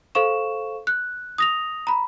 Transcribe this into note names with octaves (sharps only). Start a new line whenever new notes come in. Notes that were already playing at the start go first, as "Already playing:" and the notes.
A4 C5 F5 C#6 E7
F#6
D#6 A#6 F7
A#5 B5